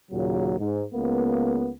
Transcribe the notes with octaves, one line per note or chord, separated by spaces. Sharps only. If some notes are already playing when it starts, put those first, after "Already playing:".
D#2 A#2 C#3 F#3
G#2
C#2 A#3 B3